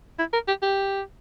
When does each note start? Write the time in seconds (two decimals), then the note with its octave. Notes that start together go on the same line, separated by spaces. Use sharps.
0.19 E4
0.33 A#4
0.48 G4
0.62 G4